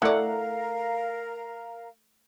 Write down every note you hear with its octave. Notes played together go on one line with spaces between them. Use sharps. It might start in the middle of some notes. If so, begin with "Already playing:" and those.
A3 E4 A#4 D5 F5 F#5 A#5